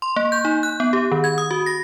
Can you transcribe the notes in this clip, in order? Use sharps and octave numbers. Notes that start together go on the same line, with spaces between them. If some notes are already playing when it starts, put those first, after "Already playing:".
C6
A#3
G6
D#4
F#6
B3
G4
D#3
G#6
D#6
F#4
A#6